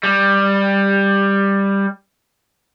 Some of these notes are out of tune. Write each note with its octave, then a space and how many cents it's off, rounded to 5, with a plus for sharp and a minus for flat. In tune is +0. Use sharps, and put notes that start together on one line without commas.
G3 +10